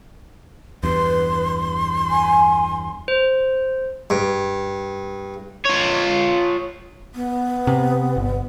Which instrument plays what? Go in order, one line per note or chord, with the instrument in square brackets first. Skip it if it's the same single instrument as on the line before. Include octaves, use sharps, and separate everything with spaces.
[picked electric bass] E2 G2 [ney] B4 [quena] C6
[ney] G#5
[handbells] C5
[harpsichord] G2
[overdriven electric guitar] F4 C#5
[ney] B3
[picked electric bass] C3
G1